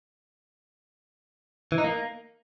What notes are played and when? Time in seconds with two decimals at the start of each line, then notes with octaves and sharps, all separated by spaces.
1.72 E3
1.78 D#4
1.84 A#3